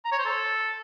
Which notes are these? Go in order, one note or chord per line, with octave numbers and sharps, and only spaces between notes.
A#5
C#5
C5
A4